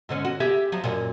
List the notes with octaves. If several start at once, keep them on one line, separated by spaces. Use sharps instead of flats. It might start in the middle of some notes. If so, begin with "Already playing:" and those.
G#2 D3 C#4
F#4
G4 G#4 E5
F3 F#3
F#2 A#2